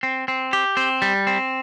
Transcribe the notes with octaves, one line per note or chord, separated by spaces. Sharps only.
C4
C4
G4
C4
G3
C4